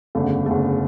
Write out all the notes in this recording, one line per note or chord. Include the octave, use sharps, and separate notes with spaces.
F#1 E2 D3 A3
F#1 E2 D3 A3